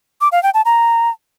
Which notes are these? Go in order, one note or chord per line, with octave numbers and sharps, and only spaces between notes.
D6
F5
G5
A5
A#5